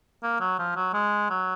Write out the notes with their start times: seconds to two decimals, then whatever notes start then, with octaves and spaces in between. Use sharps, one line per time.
0.23 A#3
0.40 F#3
0.59 F3
0.76 F#3
0.93 G#3
1.30 F#3